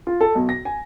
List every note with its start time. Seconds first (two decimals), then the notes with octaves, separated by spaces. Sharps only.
0.07 F4
0.21 A4
0.35 B1
0.49 A#6
0.65 G#5